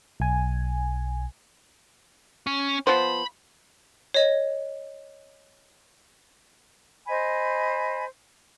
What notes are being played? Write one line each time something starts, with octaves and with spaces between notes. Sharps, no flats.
B1 G#5
C#4
F3 B3 C5 B5
C#5 D#5
C5 D#5 G#5 B5